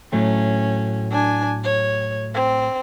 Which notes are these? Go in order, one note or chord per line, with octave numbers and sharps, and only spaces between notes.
A2 F#3 A3 C#4
D4 G#5
C#5
C4